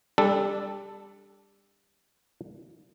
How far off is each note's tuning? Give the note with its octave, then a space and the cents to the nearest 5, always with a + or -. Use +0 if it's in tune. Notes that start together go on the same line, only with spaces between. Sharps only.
G3 +25 D4 -5 A4 +0